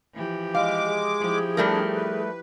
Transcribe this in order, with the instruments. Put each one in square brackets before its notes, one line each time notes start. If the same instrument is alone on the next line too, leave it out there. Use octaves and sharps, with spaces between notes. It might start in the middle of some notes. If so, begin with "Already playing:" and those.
[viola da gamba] E3 F3 G4
[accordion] G#3 D6 [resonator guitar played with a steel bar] F5
[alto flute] G#4
[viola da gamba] F3 E4 G4
[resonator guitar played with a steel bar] G3 A3 A#4 [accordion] D4
[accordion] B4